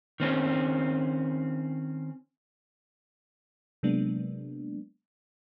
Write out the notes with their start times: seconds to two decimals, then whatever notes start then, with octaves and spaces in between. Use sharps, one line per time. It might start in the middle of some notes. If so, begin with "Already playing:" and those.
0.20 D#3 C4 C#4
3.83 C3 F#3 G#3 A#3 B3 D4